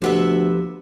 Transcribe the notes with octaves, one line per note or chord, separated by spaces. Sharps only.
D2 C3 F3 B3 E5